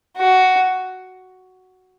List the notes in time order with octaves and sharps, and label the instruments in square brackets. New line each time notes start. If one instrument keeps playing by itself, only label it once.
[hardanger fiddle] F#4